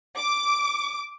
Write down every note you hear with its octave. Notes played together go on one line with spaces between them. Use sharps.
D6